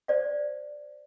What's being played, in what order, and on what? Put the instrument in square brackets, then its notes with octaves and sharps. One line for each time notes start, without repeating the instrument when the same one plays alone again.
[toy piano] C5 D5 F5